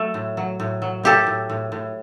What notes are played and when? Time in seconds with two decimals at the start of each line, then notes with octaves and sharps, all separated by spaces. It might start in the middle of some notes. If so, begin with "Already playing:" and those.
Already playing: F#3 A3
0.14 A2
0.37 F#3
0.60 A2
0.82 F#3
1.03 A2 G4 A4
1.27 A2
1.50 A2
1.72 A2